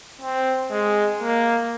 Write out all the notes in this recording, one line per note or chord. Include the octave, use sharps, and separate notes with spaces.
C4
G#3
A#3